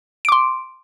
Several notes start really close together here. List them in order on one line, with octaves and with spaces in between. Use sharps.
D7 D6 C6